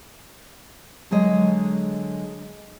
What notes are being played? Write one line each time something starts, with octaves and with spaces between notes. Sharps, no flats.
D3 F#3 G#3 D#5